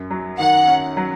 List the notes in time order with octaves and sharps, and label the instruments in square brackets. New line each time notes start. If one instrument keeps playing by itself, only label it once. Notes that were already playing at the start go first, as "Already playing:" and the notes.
Already playing: [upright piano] F#2
F#3
[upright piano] D#3 [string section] F#5
[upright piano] C#4
F#3